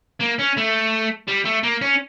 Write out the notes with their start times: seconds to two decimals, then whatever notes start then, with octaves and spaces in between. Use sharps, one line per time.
0.20 A#3
0.39 C#4
0.57 A3
1.28 G3
1.45 A3
1.64 A#3
1.81 C#4